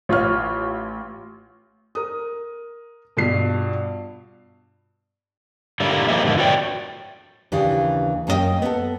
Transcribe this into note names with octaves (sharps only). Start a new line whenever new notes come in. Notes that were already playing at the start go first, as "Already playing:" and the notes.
A1 F4 C#5 F6
A#4 D#6
G2 B2 F4 C7
D3 G3 A#3 E4
F3 A#3 G4 G#4 D#5 E5
F2 G#2 D3 E3 A#3 E4
F#4 B4 C#5 D5 G5
D#2 C#3 E3 D4 G4
F#2 A#3 C#4 D#4 D#5 G5
B3 A4